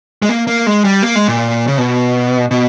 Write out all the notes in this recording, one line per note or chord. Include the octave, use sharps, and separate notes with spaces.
G#3
A#3
A#3
G#3
G3
A#3
G#3
A#2
C#3
B2
B2